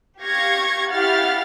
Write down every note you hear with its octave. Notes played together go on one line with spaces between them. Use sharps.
G4 F5 C#6 G#6 A#6
E4 G4 F5 F#5 F6 A6